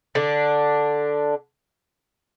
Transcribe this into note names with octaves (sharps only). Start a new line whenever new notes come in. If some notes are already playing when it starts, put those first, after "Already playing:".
D3 D4